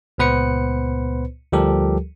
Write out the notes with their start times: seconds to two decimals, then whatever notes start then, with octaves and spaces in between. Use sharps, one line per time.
0.18 C#2 A#2 B3 B4 C5 C#7
1.52 D2 F3 G3 G4 A4 A#4